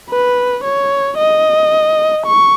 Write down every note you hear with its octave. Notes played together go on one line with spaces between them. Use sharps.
B4
C#5
D#5
C#6